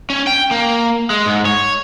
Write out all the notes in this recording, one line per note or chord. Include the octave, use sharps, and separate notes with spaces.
C#4
G5
A#3
G#3
G#2
C#5